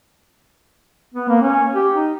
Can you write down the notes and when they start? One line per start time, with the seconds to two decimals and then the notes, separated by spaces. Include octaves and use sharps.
1.14 B3
1.28 A#3
1.41 C#4
1.73 G4
1.93 D#4